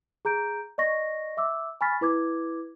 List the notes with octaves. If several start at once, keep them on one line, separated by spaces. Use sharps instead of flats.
G#4 A#5 G6 D7
D5 D#5 C#6 A#6
E5 D6 E6
G#5 B5 C#6 F6 A6 B6
E4 B4 D6 G#6